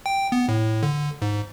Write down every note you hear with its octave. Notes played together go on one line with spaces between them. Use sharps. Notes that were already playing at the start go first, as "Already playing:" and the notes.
G5
B3
A2
D3
G#2